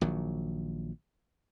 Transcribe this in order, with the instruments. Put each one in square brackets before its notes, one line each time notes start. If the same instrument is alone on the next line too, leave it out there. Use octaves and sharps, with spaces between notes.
[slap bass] A#1 D#3 F#3